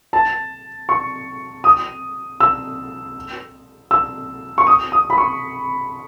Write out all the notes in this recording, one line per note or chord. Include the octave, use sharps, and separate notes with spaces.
A5
C#6
D#6
E6
E6
C#6
D#6
D#6
B5
C#6